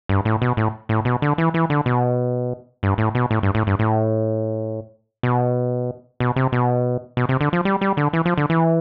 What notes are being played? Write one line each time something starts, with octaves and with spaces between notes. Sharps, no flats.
G2
A2
B2
A2
A2
B2
D3
E3
E3
D3
B2
G2
A2
B2
A2
G2
A2
G2
A2
B2
B2
C3
B2
B2
C3
D3
F3
G3
G3
D3
E3
F3
D3
E3